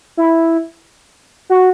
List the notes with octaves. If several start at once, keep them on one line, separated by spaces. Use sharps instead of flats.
E4
F#4